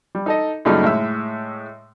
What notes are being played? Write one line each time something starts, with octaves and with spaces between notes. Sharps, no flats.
G3
D#4 A4 D#5
F#2 A#2 C#3 G3 A3 D#4
A2 G#3 E5 E6